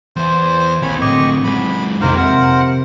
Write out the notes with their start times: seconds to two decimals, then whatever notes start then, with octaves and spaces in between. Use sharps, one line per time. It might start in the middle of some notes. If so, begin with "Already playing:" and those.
0.16 E2 E3 C5
0.82 A#1 D#2 C4 C#5 G#5 B5
1.01 A2 D3 G4 D#5 C#6 B6
1.44 F#2 G#3 F#5 B5
2.01 A#1 F2 C3 D#3 A#3 D#4 A#4 C5
2.18 A#4 C5 E5 F#5